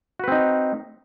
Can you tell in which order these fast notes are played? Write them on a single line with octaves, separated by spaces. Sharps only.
F#4 B4 C4 D#4